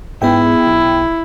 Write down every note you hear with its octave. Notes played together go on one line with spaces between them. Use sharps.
G#2 B3 E4 G#4 G5
B1